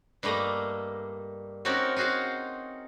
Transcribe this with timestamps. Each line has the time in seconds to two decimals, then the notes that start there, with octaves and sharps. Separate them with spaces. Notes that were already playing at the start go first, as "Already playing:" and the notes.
0.23 G2 G3 A3 A#3 D#5 A#5
1.65 C4 C#4 D#4 F#4 A#4 D5
1.96 D#4 F4 F#4 G#4 F5